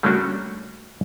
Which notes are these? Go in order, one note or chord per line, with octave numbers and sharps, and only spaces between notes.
G3 A3 A#3 C#4 D4 F#4